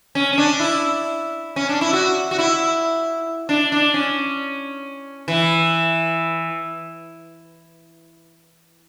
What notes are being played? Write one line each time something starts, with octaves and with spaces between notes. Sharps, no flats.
C#4
C#4
D4
E4
C#4
D4
E4
F#4
F#4
E4
D4
D4
C#4
E3